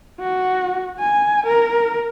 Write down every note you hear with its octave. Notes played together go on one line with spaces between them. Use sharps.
F#4
G#5
A#4